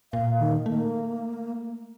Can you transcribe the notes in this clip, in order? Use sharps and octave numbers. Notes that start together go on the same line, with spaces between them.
A#2 F5
D#3
A3 A#3